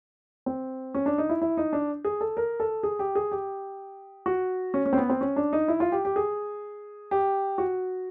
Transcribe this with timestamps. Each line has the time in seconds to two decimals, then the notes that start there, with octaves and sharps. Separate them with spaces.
0.46 C4
0.94 C#4
1.06 D4
1.18 D#4
1.29 E4
1.42 E4
1.57 D#4
1.73 D4
2.05 G#4
2.21 A4
2.37 A#4
2.60 A4
2.83 G#4
2.99 G4
3.15 G#4
3.31 G4
4.26 F#4
4.74 C#4
4.86 C#4
4.93 C4
4.98 B3
5.09 C4
5.21 C#4
5.36 D4
5.53 D#4
5.68 E4
5.80 F4
5.92 G4
6.05 G4
6.16 G#4
7.11 G4
7.58 F#4